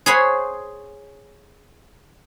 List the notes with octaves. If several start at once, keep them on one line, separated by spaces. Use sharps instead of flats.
G#4 C5 C#5 F#5 G#5 B5